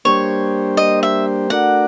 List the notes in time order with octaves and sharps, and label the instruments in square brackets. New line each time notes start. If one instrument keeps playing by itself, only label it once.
[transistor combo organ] G3 A#3 D4 G4 C5 [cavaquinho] C#5
[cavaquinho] D#5
E5
[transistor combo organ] A3 D4 F#4 A#4 D5 [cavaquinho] F#5